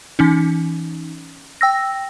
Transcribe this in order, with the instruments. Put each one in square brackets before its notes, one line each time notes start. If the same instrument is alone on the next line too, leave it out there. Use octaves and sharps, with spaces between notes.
[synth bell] E3 C#4 D#4
G5 E6 A#6